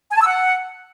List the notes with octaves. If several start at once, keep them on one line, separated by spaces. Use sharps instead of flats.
G#5
A5
E6
F#5